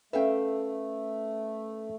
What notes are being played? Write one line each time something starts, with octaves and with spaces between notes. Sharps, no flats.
A3 C#4 A4 B4 E5 F5 G5